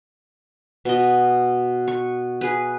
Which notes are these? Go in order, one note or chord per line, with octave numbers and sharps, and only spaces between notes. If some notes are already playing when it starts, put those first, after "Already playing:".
B2 D#5
C#6
G#4 B4